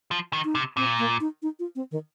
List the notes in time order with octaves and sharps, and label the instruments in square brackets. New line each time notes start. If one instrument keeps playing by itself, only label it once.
[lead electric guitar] F3
D#3
[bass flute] D#4
[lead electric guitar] C3
[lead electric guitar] A#2 [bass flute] C4
[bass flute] A#3
D#4
D#4
F4
C4
D#3